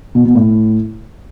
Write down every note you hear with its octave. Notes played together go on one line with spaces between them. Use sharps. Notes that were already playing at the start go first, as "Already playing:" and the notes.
B2
B2
A2